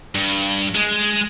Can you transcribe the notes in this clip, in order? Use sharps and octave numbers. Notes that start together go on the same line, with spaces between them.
G2
G#3